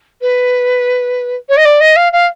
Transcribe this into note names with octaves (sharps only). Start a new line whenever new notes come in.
B4
C#5
D#5
D5
D#5
F5
F5